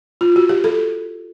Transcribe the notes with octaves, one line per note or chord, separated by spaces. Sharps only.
F4
F#4
G4
A4